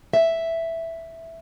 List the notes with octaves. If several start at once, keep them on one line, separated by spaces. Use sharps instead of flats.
E5